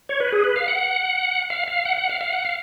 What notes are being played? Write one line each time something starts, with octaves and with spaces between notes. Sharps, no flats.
C#5
B4
G#4
B4
F5
F#5
F5
F5
F#5
F#5
F5
F5
F#5
F5